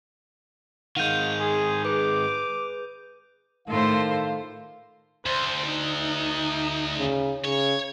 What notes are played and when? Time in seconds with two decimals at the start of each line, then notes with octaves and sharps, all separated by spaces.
0.97 D#3 G#3 F5 F#5 G6 D#7 F7
1.40 G#4 C6
1.85 G#4 B4 D6
3.67 A2 D#3 F4 A4 C5 F5 C6
5.26 D2 C5
5.67 D#4
6.98 C#3
7.45 C#3 C#5